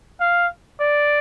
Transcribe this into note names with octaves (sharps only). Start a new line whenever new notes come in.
F5
D5